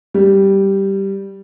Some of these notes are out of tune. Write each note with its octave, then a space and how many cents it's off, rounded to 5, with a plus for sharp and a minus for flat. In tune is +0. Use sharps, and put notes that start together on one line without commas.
G3 -5